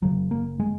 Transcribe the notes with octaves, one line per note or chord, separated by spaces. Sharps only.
F#1 F#2 C#3 F#3
A#3
G#3